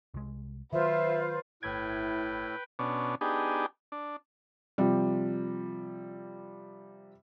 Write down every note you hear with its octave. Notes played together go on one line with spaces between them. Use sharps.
C2 G#3
D#3 F#3 F4 B4 C5 E5
G1 A2 E4 B4 G5 G#6
B2 C#4 D4
B3 D4 D#4 G4 G#4
D4
C3 F3 G3